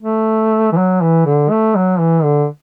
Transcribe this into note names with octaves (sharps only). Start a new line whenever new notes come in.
A3
E3
F#3
E3
D3
A3
F#3
E3
D3